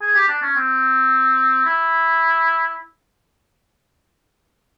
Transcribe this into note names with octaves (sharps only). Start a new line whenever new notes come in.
G#4
G4
D4
C#4
C4
E4